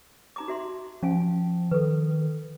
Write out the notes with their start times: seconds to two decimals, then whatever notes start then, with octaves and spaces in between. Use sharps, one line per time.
0.36 D#4 A#5 D6
0.48 F#4 E5 C6
1.03 F3 C#4 F5 G#5
1.71 D#3 A4 B4